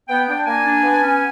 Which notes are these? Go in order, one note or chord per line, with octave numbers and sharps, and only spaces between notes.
B3 G5
D4 G5
A#3 G#5
D4
B3
C#4